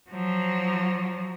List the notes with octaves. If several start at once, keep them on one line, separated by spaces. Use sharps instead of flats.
F3 F#3